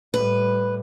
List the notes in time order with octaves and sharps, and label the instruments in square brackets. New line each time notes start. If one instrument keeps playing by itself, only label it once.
[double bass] A2 G3 [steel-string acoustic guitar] B4